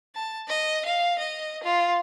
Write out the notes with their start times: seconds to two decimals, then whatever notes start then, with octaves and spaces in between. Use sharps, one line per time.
0.15 A5
0.48 D#5
0.85 F5
1.19 D#5
1.63 F4